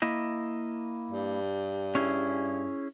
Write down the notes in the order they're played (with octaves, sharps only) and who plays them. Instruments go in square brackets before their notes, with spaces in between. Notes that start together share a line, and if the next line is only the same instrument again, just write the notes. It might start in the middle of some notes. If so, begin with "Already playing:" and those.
[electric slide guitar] A#3 E4 D#5
[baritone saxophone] G2
[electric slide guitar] C#4 E4 G#4